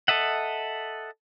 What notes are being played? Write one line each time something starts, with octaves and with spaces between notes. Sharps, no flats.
A4 D#5 E5 F#5